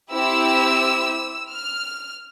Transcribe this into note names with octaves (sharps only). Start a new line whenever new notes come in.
C4 E4 G4 E6
F6